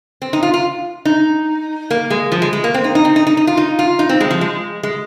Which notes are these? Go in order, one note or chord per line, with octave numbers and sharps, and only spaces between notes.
C4
D#4
F4
F4
D#4
A#3
G#3
F3
G#3
G#3
A#3
C4
D#4
D#4
C4
D#4
D#4
D#4
F4
D#4
F4
D#4
C4
G#3
F3
G#3
G#3